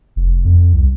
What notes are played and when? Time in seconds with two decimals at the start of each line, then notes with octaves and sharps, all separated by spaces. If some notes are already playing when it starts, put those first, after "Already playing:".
0.16 F1
0.45 F2
0.73 C2